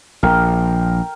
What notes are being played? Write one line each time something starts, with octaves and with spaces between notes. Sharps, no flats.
A#1 A#4 G5